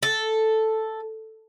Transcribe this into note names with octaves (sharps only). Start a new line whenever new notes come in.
A4